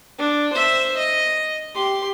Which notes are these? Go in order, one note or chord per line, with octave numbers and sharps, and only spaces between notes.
D4
C5 E5
D#5
G4 C6